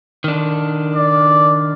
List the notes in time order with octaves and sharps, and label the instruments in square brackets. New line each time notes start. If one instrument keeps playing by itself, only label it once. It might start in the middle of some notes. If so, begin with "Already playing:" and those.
[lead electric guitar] D#3 D4
[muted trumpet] D5